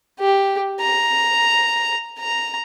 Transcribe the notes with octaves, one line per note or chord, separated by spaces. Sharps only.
G4
A#5
A#5